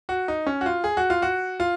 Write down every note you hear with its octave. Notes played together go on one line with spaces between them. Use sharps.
F#4
D#4
C#4
F#4
F4
G#4
F#4
F4
F#4
F4